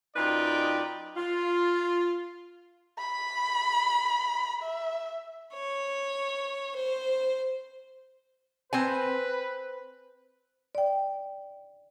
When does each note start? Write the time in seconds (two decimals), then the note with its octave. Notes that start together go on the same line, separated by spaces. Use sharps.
0.16 F#2 D#4 F4 B4 D5 G5
1.17 F4
2.98 B5
4.62 E5
5.53 C#5
6.76 C5
8.73 C4 B4 C5 G#5
10.75 D5 G5